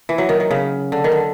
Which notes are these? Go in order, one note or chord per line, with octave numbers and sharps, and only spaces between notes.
E3
F#3
D#3
D#3
C#3
D3
D#3
D3